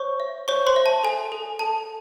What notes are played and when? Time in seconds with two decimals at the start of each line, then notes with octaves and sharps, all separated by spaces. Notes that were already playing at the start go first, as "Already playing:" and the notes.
Already playing: C5 C#5 C#6
0.20 E5
0.48 C5 C#5 C#6
0.67 C5 C6
0.76 E5
0.86 A5
1.03 A4 G#5
1.32 A4
1.59 A4 A5